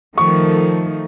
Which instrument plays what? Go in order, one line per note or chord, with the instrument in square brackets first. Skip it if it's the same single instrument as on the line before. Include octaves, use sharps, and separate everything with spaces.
[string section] D#3 F3 A3 [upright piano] C#6